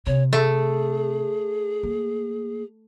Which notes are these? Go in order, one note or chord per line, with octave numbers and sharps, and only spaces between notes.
C3 C#5
A3 G#4
A#3